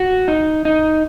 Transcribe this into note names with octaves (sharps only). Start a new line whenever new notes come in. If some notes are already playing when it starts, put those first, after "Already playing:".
Already playing: F#4
D#4
D#4